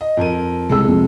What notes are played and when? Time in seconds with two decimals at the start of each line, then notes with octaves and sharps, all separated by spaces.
0.01 D#5
0.17 F2 A#4 D#7
0.69 C2 G#3 A4 E6
0.88 F2